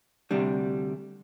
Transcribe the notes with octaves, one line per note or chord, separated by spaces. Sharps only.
D2 C3 G3 D4